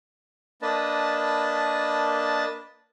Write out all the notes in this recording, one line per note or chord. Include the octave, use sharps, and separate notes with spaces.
A#3 D4 B4 D#5 A5